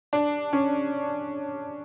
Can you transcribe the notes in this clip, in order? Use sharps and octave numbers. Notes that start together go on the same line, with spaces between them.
D4
C#4